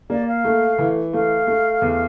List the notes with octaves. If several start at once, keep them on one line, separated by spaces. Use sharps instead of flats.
A#3 D5
F5
A3
E3
A3 F5
A3
E2